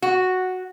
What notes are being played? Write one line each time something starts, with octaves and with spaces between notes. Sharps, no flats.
F#4